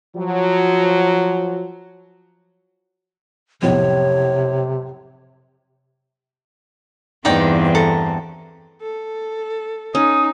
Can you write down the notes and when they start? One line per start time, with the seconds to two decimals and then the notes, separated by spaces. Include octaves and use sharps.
0.15 F3 F#3
3.62 B1 F2 A2 C3 C#5
7.25 E2 G2 C4 D#4 D5 G5
7.75 A4 A#5
8.81 A4
9.95 C#4 D#4 D#6